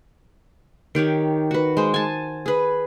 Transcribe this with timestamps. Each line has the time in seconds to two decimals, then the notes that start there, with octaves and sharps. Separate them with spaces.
0.95 D#3 G4 C#5 D6
1.51 F#4 B4
1.77 G#3 C5
1.94 G#5 A5
2.46 G#4 B4